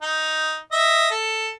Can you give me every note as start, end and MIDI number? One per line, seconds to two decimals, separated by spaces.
0.02 0.58 63
0.72 1.09 75
0.72 1.09 76
1.11 1.50 69